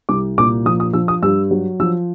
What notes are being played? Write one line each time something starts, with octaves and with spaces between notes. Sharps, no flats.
C2 D6
A#2 D6
F3 D#6
D#6
F3 E6
D#6
G2 E6
F#3
F3 E6